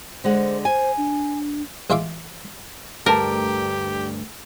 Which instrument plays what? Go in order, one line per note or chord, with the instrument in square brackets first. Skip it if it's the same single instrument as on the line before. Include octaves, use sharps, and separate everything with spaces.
[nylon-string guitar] D3 G#3 F#5 [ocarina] C5
[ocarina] C5 [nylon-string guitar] G#5
[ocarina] D4
[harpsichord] A1 G#3 F4 E5 F5 D6
[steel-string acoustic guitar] D2 G2 A3 [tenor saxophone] G4 [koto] A#4 [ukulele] A5 A#5